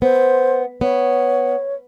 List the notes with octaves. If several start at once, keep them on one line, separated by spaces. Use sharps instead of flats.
B3 C5
B3 C#5